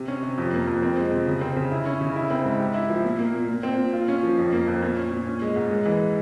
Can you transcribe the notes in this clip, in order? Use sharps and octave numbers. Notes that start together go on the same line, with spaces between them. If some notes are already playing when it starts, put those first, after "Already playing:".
Already playing: C3
C#4
C3
F2
A#3
F2
C4
G#3
C3
C#3
C4
C#3
E4
C#4
C#3
E4
C4
G#2
G4
E4
F3
A#2
A#3
A#2
A#2
C4
A#2
F4
C#4
F3
F2
A#3
F2
A#2
C#4
A#2
C#4
G#3
G#2
G#3
E3